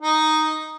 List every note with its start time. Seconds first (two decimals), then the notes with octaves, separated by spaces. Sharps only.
0.01 D#4